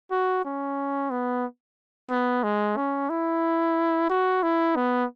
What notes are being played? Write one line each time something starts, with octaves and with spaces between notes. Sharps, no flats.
F#4
C#4
B3
B3
G#3
C#4
E4
F#4
E4
B3